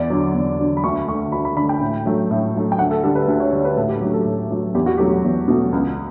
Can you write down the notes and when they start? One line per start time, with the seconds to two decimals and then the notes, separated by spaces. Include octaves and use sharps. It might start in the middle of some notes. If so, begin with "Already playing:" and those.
Already playing: E2 D5
0.10 D3 F#3
0.35 E2
0.59 D3 F#3
0.77 B5
0.84 D2 C#6
1.08 A3 C#6
1.12 D3
1.32 D2 B5
1.45 B5
1.56 D3 B5
1.61 A3
1.69 G5
1.81 A2
2.06 F#3 A3
2.31 A2
2.55 F#3 A3
2.72 G5
2.79 D2 F#5
2.91 A4
3.03 D3 G3 A4
3.15 B4
3.28 D2
3.40 C#5
3.53 D3 G3 C#5
3.65 B4
3.77 A2 A4
3.89 G4
4.01 F#3 G4
4.05 A3
4.13 A4
4.25 A2
4.51 F#3 A3
4.75 E2 G4
4.86 F#4
4.97 B2 F#3 A3 G4
5.24 E2
5.48 B2 F#3 A3
5.72 C#2